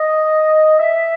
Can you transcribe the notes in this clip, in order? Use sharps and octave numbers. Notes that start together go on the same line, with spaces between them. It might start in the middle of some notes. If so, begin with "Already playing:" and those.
Already playing: D#5
E5